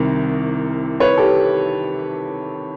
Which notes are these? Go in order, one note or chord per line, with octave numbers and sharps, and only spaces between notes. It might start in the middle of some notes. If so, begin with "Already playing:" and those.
Already playing: C2 C3 D#3 A#4
B4 C#5
G4 A4